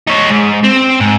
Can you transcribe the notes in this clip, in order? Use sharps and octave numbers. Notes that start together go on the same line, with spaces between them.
D#4 C#5
G#2
C4
G#2